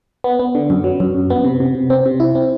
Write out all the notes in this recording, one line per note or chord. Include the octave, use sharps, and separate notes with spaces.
B3
B3
D3
F#2
F#3
F#2
F#2
B3
C3
C3
C3
C4
C3
E4
C4